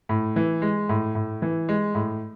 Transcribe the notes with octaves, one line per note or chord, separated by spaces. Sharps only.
A2
E3
G#3
A2
A2
E3
G#3
A2